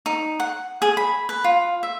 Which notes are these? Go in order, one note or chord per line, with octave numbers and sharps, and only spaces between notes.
D#4
F#5
G#4
B5
B4
F4
E5